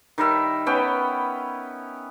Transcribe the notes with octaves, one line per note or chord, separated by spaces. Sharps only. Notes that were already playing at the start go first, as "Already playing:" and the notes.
D#3 G3 A#4 E5
B3 C#4 G5